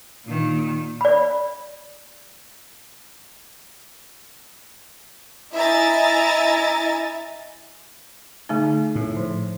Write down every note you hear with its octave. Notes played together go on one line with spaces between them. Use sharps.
A#2 D#3
D5 B5
E4 D#5 E5 G#5 A#5 A6
D3 A3 D#4
A2
F3